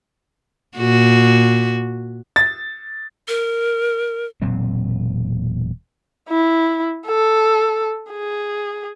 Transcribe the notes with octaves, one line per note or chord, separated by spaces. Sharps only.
A#2 F#4
A6
A#4
E1 A#2 F#3 C4
E4
A4
G#4